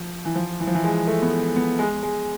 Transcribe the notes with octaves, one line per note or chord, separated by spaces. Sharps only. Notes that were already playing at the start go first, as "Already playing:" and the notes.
Already playing: F3
E3
F3
E3
F3
E3
G#3
A3
B3
A3
B3
G#3
G#3